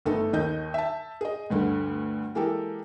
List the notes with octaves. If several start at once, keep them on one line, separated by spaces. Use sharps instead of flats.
G1 A3 D#4 A4
D#2 D#3 D#5 G6
E5 A5
G#4 D#5
D2 G2 D3
E3 G#3 A#3 G4 A4